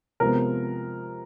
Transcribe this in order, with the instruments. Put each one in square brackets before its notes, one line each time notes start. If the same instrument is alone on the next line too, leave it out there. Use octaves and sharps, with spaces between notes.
[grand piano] C3 F3 G#3 B3 A#4